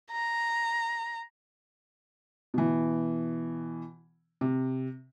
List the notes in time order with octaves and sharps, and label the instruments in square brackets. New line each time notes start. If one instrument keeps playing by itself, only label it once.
[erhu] A#5
[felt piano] B2 E3
C3